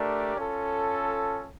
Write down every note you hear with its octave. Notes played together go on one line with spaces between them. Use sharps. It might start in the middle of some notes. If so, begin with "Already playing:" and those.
Already playing: A3 D4 G4 A#4 D5
C#4 F4 A4